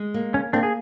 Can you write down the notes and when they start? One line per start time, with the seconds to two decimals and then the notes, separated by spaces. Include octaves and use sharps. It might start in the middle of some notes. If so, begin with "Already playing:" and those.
Already playing: G#3
0.14 A#3
0.34 C#4
0.53 A#3 C4 D4
0.63 G#4